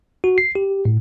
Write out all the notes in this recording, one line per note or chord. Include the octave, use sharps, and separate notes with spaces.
F#4
C7
G4
A2